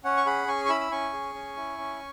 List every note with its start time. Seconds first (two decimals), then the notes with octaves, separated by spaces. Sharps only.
0.04 C#4 C#5 F#5
0.17 C#6
0.26 G#4 F#5 B5
0.47 C#4 G#5 C#6
0.65 C#6
0.69 E4 B5 E6
0.81 E6
0.91 C#4 G#5 C#6
1.13 G#4
1.35 C#4
1.57 E4
1.78 C#4